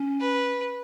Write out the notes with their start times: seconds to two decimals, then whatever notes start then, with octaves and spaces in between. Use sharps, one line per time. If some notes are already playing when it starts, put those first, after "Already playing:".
Already playing: C#4
0.20 B4